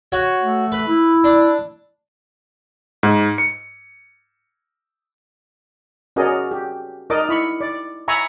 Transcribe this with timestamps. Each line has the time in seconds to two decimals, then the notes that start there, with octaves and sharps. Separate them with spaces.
0.12 F#4 C#5
0.41 A3
0.72 B4
0.87 E4
1.24 D4
3.03 G#2
3.38 C#7
6.16 C#4 F#4 G#4 A#4 D5 D#5
6.51 G4
7.10 D#4 A#4 D5 D#5 D6
7.29 E4 B5 C#6
7.61 D5
8.08 E5 G#5 A#5 B5 C#6